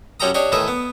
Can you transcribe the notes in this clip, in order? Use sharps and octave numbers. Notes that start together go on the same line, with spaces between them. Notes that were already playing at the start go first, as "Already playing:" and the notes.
F#2 C#4 G4 A4 A#5 D#6
D4 G4 C#5 D#5
A2 D#3 E3 D#5 E5 A5
B3